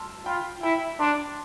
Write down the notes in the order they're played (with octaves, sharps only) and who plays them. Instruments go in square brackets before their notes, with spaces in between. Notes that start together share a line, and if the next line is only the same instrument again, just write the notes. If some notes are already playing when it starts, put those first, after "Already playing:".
Already playing: [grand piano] A5 C6 E6 F6
[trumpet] F4 [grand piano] G5 B5
[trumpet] E4 [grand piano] G5 B5
[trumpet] D4 [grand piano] A5 C6